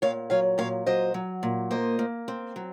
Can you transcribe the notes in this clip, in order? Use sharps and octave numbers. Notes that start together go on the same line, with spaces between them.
A#2 C#5 F5
F#3 C#5 F5
A#2 C#5 F5
F#3 C5 D#5
F#3
A#2
A#3 C5 D#5
A#3
C4
F#3